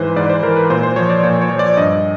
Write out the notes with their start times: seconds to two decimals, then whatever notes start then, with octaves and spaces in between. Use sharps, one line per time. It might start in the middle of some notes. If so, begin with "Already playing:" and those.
Already playing: G#2 E3 B4 C5
0.16 G#2 D5
0.30 C5
0.43 E3 A#4
0.56 B4
0.70 A#2 C5
0.83 C5
0.96 F3 C#5
1.10 D5
1.23 A#2 C#5
1.41 C#5
1.50 F3
1.59 D5
1.77 G2 D#5